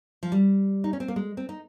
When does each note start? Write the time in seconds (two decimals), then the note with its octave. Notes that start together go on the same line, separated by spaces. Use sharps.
0.23 F3
0.32 G3
0.84 D#4
0.93 C#4
1.00 C4
1.08 A#3
1.16 G#3
1.37 C4
1.49 D#4